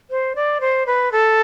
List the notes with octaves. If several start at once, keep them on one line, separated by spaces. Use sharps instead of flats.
C5
D5
C5
B4
A4